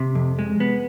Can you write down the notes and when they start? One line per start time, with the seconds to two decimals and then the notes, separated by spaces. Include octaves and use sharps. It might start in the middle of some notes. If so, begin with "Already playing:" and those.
Already playing: C3
0.15 F2
0.39 G#3
0.60 B3